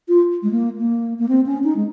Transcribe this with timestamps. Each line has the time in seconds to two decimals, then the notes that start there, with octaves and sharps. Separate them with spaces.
0.09 F4
0.43 G#3
0.51 A#3
0.78 A#3
1.19 A#3
1.29 C4
1.46 C#4
1.64 D#4
1.76 G#3